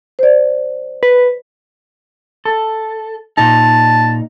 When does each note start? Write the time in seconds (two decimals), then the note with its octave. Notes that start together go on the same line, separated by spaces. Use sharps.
0.19 C5 D5
1.03 B4
2.45 A4
3.37 A#2 D#4 A5